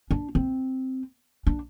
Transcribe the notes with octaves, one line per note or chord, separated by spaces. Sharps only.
D4
C4
D4